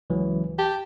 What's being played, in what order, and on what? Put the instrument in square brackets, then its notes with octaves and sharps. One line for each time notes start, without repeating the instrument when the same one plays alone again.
[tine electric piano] C#2 E3 F#3
[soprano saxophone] G4 [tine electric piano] A5